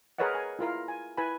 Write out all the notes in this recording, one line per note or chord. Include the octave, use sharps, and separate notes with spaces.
G#4 A#4 B4 C#5 D#5 F#5
G#5
E4 F4 A#4 F5
G#5
E4 B4 G#5 B5